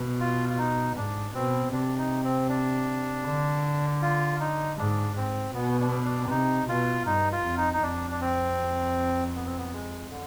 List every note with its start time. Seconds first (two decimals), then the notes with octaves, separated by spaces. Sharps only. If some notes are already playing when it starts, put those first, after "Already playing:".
Already playing: B2
0.20 F4
0.49 F4
0.58 D#4
0.97 G#2 D4
1.34 B2 C4
1.73 C3 D4
1.98 D#4
2.24 C4
2.49 D4
3.26 D3
4.02 F4
4.40 D#4
4.77 G#2 D4
5.16 G#2 C4
5.54 B2 B3
5.80 D4
6.05 D4
6.30 C3 D#4
6.69 B2 F4
7.06 G2 D#4
7.32 F4
7.45 F2
7.57 D#4
7.74 D#4
7.82 F2 D4
8.11 D4
8.21 C4
9.35 B3
9.46 C4
9.58 B3
9.73 G#3
10.11 D3